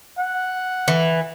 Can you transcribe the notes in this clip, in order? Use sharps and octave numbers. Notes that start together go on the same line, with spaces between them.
F#5
E3